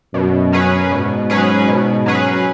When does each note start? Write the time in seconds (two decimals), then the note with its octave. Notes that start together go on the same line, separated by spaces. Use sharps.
0.14 F#2 B2
0.52 F#3 C#4 G#4 B4
0.91 G#2 B2
1.30 F#3 C#4 G#4 B4
1.68 B2
2.06 F#3 C#4 G#4 B4